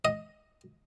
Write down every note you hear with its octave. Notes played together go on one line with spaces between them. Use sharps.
D#5